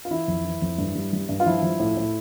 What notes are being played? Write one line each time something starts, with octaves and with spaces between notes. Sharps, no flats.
F4
E3 E4
F2
E3
F2
G2
G3
G3
G2
F4
F3 E4
F3
A2
A2